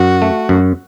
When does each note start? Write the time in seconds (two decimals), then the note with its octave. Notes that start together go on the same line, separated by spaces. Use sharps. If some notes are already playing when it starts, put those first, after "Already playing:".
Already playing: F#2 F#4
0.22 A3
0.49 F#2